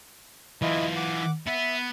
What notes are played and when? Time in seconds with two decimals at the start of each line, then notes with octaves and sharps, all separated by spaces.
0.62 E3 E4 F4 D#5
0.96 F#5 D6
1.47 B3 E5